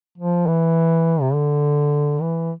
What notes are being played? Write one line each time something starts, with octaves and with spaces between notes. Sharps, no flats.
F3
E3
C3
D3
E3